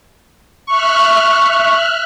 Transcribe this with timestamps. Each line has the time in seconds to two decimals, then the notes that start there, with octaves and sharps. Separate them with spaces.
0.67 E5 C#6 F6 F#6